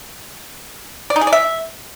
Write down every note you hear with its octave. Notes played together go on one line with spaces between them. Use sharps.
D5
D#4
G#4
D5
E5